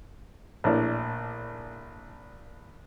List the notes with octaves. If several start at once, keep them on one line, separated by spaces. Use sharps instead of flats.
A#1 A2 A#3 D4 C#5